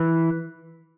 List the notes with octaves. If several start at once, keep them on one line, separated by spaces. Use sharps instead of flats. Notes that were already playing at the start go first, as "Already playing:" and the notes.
Already playing: E3